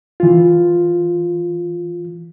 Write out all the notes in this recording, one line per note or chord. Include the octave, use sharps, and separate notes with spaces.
E3 F4